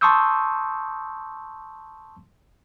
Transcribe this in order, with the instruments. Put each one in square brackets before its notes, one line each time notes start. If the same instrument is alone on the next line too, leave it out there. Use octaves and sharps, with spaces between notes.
[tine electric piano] A5 C6 C#6 D#6 E6 G6